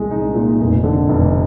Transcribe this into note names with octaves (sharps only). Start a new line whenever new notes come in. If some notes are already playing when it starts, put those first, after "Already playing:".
Already playing: C2 G#3
D#4
A#2
F1
D3
F1